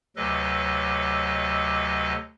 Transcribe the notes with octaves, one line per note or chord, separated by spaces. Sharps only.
D2 C3 F#3 A4 B4 D#5